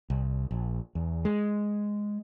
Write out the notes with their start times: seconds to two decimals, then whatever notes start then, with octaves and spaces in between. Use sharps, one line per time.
0.10 C2
0.51 A#1
0.95 E2
1.25 G#3